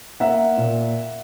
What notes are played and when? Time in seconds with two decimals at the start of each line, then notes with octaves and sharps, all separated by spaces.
0.20 A#3 E5 F#5
0.57 A#2